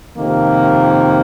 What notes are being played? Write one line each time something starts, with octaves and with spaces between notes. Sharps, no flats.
F2 C3 D#3 A#3